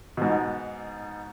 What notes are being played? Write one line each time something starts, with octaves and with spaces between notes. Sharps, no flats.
G#2 B2